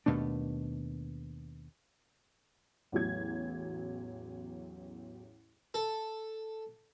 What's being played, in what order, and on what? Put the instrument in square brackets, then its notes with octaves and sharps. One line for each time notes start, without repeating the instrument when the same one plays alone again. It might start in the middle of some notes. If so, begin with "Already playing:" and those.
[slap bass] D#2 B2 A3 D4
[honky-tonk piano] A1 E2 F#3 G#6
[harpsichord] A4